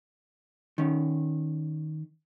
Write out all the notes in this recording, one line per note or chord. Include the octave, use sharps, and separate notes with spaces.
D#3 C#4